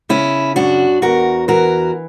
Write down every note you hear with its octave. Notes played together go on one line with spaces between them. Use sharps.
C#3 C#4 E4
F#2 D4 F#4
E2 F#4 A#4
E3 F#4 A#4